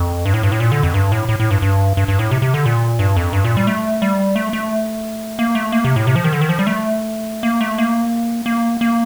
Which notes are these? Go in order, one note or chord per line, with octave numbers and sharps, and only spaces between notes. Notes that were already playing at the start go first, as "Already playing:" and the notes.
Already playing: F2
G2
A2
G2
A2
A#2
D3
F2
G2
A2
A2
A2
G2
G2
G2
G2
A2
C3
C3
D3
A#2
G2
F2
G2
A#2
G3
A3
G3
A3
A3
A#3
A3
A#3
C3
A2
C3
F3
D#3
D3
D#3
F3
G3
A3
A#3
A3
A#3
A#3
A#3